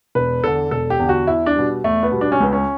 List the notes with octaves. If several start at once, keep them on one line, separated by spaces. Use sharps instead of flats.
E1 B4
E2 D3 A4
E1 A4
G4
E2 D3
F#4
E2 E4
D4
B2 G3
E2 A3
B3
B2 G3
D4
C#4
C#2 B3
C#4